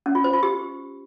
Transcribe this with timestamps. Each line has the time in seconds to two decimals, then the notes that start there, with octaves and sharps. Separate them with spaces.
0.06 C#4
0.15 F4
0.24 C5
0.34 F4
0.43 G4